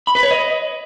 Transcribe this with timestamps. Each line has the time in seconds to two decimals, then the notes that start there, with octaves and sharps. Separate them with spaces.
0.07 B5
0.15 B4
0.23 C#5
0.31 D#5